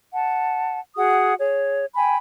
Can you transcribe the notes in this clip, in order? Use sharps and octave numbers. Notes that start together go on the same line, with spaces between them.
F#5 A5
F#4 G#4 F#5 D#6
G#4 C#5
G5 G#5 B5